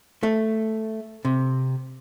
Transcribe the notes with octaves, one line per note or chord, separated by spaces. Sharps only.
A3
C3